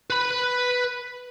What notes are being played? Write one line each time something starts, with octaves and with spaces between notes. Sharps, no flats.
B4 B5